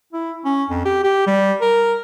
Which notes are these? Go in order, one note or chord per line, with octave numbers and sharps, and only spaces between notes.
E4
C#4
F2
G4
G4
G3
A#4